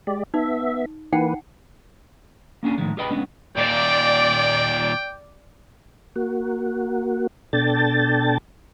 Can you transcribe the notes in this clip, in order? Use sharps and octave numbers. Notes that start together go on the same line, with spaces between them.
G#3 G4 D5
B3 D#4 E5
E3 A#3 D#4 B4 F#5 G5
A#3 C#4 D4 G#4
A2 D#3 F3 G#3
G4 G#4 B4 D#5 G5 B5
G#3 B3 C#4 D4
D#2 A#2 D5 G5
A#3 F#4
B2 D4 A4 G5 A5 A6